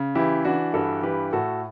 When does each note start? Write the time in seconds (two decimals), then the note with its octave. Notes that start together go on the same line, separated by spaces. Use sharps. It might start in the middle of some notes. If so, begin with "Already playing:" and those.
Already playing: C#3
0.15 E3 E4 G4
0.45 E3 D4 F#4
0.74 G2 F#4 A4
1.03 E3 G4 B4
1.33 A2 F#4 A4